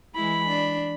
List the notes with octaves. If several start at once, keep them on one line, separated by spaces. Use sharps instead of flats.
E3 G#3 E4 B5
D4